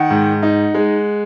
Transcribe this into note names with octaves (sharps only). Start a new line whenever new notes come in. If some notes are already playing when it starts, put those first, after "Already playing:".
Already playing: D#3 F#5
G#2
D#4
G#3